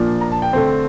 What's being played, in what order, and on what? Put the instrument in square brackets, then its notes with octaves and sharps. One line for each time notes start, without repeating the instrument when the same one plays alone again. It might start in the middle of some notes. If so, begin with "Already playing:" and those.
Already playing: [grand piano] A#2 F3 A#3 D4
A#5
A5
G5
D3 A3 C4